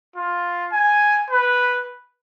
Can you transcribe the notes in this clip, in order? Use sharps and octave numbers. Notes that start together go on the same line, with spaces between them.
F4
G#5
B4